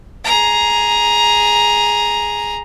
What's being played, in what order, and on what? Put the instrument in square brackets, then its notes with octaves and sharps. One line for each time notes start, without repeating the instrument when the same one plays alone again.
[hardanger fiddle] G#4 A#5